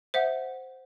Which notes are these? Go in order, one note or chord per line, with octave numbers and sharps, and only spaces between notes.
C5 E5 F#5